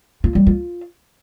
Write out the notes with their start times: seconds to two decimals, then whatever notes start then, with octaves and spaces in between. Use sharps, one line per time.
0.24 F4
0.35 G3
0.47 F4